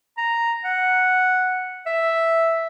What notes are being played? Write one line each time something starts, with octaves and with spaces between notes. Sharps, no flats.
A#5
F#5
E5